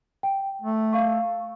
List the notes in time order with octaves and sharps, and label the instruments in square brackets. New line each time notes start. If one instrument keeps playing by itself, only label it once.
[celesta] G5
[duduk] A3
[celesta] F5 C#6